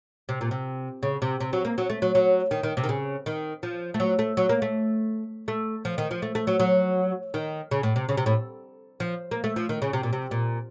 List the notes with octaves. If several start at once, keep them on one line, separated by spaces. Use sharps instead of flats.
C3
A#2
C3
C#3
C3
C3
F#3
A#3
F#3
A3
F#3
F#3
D#3
D#3
C3
D#3
C#3
D#3
F3
A3
F#3
A3
F#3
A#3
A3
A3
F3
D#3
F3
A3
A3
F#3
F#3
D#3
C#3
A2
C3
C#3
C3
A2
F3
A#3
A3
F3
D#3
C#3
C3
A#2
C3
A#2